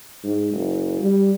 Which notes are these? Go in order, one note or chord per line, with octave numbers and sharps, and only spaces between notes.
G#2
F#1
G3